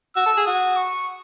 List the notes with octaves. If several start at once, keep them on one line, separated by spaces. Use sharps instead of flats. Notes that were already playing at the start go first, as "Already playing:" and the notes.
F#4 E6
A4
G#4
F#4 D#6
C#6